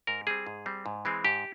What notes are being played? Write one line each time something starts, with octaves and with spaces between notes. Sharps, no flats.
G#2 A#4
G3 C4 G#4
G#2
G3 C4
G#2
E3 G#3 C4
G#2 G4